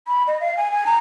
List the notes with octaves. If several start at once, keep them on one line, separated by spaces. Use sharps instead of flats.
B5
D#5
F5
G#5
G#5
A#5